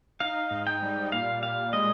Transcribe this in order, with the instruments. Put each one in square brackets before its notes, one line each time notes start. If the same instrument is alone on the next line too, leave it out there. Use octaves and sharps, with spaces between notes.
[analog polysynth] D#4 [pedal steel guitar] F5
[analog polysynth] G#2
[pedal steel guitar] G5
[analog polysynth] G3
[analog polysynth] A#2 [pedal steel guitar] F5
[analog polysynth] A#2 [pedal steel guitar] F5
[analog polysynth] G#3 [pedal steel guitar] D#5